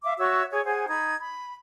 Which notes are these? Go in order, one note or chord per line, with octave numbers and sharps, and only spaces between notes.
E5 F5 D6
F#4 C#5 E5 E6
G#4 C#5
G#4 C5 F#5 G#5
D#4 B5 G#6
B5